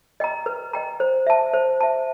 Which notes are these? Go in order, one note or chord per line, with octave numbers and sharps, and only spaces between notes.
D#5 G5 A#5
B4
D#5 G5 A#5
C5
E5 A5
C5
E5 A5